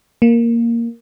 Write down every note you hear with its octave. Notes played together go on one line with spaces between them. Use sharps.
A#3